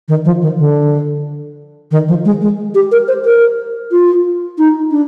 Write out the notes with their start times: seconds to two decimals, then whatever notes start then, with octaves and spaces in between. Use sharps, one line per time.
0.08 D#3
0.25 F3
0.42 D#3
0.58 D3
1.91 D#3
2.08 F3
2.25 G#3
2.41 G#3
2.75 G4
2.92 A#4
3.08 C5
3.25 A#4
3.91 F4
4.58 D#4
4.91 D4